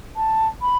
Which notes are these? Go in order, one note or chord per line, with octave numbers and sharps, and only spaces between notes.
A5
B5